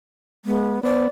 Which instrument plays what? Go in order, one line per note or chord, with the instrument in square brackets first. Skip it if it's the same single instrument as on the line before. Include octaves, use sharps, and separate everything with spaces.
[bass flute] G#3 [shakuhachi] B3
[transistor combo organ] B3 [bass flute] C5 [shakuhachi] D5